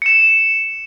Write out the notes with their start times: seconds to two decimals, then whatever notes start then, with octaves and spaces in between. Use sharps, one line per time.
0.02 C#7 E7